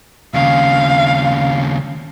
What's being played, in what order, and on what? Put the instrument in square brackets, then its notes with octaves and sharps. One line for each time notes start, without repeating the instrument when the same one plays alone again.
[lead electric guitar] D#2 C#3 [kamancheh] F5